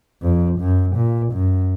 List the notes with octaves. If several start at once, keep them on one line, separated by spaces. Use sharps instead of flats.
F2
F#2
A#2
F#2